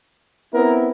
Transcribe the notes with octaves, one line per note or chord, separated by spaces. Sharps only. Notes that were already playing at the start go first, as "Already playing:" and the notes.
B3 C4 E4 A#4